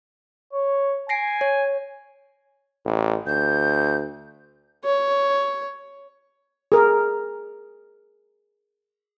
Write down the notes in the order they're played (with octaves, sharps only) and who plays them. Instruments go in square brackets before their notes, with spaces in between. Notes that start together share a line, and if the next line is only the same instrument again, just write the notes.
[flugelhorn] C#5
[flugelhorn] G#5 [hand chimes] A#6 C7 D7
[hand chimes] C#5
[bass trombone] A1
[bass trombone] D2 [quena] G6
[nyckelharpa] C#5
[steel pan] G#4 A#4